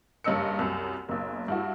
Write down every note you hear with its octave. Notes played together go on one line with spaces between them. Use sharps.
F#1 G2 C#4 D#5 E6 C#7
C2 F#2
F#1 B1
G2 E4 F#4